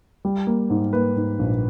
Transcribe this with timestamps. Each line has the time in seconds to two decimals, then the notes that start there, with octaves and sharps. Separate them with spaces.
0.25 G3
0.47 A#3
0.70 G#2
0.93 A#3 B4
1.16 G#2
1.39 A#1